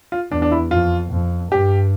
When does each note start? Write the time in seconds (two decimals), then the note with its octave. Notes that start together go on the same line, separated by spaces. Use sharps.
0.12 F4
0.32 E2 D4
0.42 D4
0.52 E4
0.71 F2 F4
1.12 F2
1.52 G2 G4